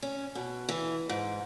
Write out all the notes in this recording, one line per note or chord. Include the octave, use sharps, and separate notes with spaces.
C#4
B2
E3
G#2